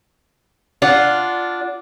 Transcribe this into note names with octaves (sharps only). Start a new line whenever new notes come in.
D4 F4 F#5